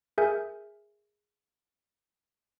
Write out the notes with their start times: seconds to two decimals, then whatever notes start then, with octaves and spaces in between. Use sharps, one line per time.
0.18 G#4 A#4 E5 G#5 G6